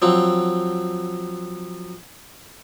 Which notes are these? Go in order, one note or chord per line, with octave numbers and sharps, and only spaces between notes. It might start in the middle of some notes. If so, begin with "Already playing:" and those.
F3 F#3 C4